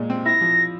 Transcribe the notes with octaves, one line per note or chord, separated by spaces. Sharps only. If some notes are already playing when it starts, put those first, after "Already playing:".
Already playing: A#2 G#3
C4
E4 A#6
F3